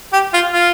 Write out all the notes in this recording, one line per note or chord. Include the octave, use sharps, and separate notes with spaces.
G4
F4
F4